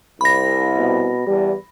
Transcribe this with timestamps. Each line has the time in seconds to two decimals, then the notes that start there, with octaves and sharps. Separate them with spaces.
0.21 C2 B5 A#6
0.77 B2
1.27 E2 G3